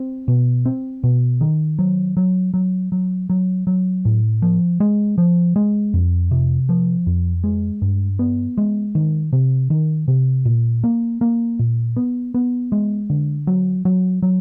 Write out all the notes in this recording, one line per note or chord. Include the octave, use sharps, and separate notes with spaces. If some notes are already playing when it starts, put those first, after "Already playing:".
Already playing: C4
B2
C4
B2
D#3
F#3
F#3
F#3
F#3
F#3
F#3
A2
F3
G#3
F3
G#3
F2
C3
F3
F2
G#3
G2
B3
G#3
D#3
C3
D#3
C3
A#2
A#3
A#3
A#2
B3
B3
G#3
D3
F#3
F#3
F#3